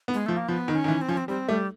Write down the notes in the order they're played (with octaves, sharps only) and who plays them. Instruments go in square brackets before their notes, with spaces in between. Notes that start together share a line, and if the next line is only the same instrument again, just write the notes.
[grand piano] B3
[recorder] G#3
[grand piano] F3 [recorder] A3
[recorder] A#3
[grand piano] F3 [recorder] B3
[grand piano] D#3
[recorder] C#4
[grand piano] D#3
E3
[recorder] C4
[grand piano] F3 [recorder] C#4
[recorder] C4
[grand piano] G3 [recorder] C4
[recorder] G3 [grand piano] A3